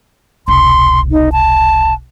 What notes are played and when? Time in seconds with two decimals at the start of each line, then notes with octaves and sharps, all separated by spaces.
0.48 E1 C2 C6
1.11 D#4
1.32 A5